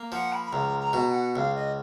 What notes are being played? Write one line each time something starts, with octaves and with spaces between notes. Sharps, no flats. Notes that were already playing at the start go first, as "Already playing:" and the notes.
Already playing: A#3
F3 F#5
B5
B5
C#2 A#5
A#5
B2
A#5
F#5
C#2 F5
D#5